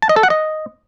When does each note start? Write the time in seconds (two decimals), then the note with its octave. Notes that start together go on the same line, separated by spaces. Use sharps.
0.02 A5
0.09 D#5
0.16 A4
0.23 F#5
0.30 D#5